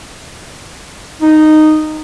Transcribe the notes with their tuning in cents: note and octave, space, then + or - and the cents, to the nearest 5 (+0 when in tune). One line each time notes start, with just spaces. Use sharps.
D#4 -10